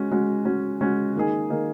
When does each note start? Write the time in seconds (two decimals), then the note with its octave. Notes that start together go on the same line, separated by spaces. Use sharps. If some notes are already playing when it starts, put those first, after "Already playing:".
Already playing: G#3 C#4 F#4
0.11 G#3 C#4 F#4
0.45 G#3 C#4 F#4
0.81 G#3 C#4 F#4
1.15 D#3 A#3 D#4 G#4
1.50 D#3 A#3 D#4 G#4